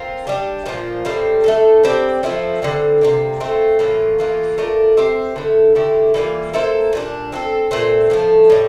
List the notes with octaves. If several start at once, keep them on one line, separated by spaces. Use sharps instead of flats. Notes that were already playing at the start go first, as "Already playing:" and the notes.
Already playing: C4 F4 A#4
G3 D4 G4
A#2 F3 A#3 F4
A2 G3 C4
A3 D4 A4
G3 C4 G4 D5
F3 A3 C4 E4
D3 G3 C4
C3 G3 A#3
A3 C4 F4
A2 E3 A#3 F4
A2 E3 A#3 F4
A3 D4 F4 A#4
C4 G4 C5 E5
D3 A3 E4
D3 A3 E4 G4
E3 G3 A#3 F4
A#3 E4 A4 C5
A#2 G3 D4
C4 E4 A4
A#2 A3 C4
A2 F3 A3
A2 G3